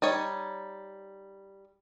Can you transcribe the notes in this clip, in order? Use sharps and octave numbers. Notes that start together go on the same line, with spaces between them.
G3 D#4 C#5